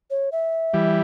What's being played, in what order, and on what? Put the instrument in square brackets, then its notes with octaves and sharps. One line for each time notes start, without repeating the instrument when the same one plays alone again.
[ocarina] C#5
E5
[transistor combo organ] E3 G3